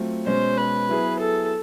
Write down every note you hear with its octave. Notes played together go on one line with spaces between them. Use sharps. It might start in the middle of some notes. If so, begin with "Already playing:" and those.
Already playing: F#3 A3 C4 F4
B2 G#3 C#4 C5
B4
F#3 B3 E4 G#4
A4